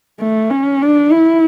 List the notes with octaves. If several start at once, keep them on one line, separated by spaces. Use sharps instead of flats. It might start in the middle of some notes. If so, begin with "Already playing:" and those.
A3
C#4
D4
E4